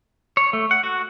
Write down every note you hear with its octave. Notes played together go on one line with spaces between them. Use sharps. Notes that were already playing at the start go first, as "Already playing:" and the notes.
C#5
A3
F#5
F#4